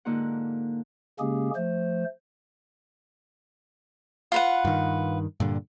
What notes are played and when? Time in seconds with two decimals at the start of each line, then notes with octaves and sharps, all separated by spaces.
0.05 G#2 D3 A#3 D#4 F4 F#5
1.20 C#3 G#3 A#3 C#4 G4 G#4
1.56 F3 A3 C5
4.32 F4 B4 F#5
4.65 G2 D#3
5.40 G2 A#2 D3